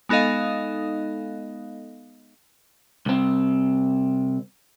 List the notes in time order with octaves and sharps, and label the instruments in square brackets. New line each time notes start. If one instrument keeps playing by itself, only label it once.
[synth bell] G#3 B3 D#4 A4 D#5 F5
[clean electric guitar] C2 C4